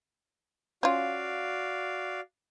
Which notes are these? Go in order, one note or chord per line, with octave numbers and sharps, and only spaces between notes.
C#4 F4 F#4 D5 F5